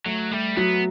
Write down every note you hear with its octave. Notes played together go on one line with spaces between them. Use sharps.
F#3 A3
G3 A3
F#3 B3